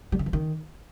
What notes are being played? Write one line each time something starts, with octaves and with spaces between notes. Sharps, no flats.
G3
D#3
E3
D#3